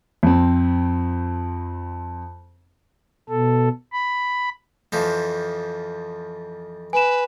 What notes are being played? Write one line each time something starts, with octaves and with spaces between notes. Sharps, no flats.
F2 C4
B2 A4
B5
F2 E3 F3
B4 G#5 E7